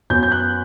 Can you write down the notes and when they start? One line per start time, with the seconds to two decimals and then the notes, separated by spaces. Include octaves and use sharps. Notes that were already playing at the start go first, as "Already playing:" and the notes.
0.10 F#2 F#3 B3 G6
0.23 G6
0.32 F#6